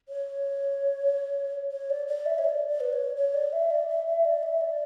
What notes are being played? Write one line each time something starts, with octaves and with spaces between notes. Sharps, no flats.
C#5
C#5
D5
D5
E5
C#5
D5
D5
B4
C#5
C#5
D5
E5
D5
E5
E5
D5
E5
D5